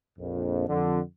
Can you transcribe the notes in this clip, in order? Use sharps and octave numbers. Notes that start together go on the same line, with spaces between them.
A#1 F2
F2 D3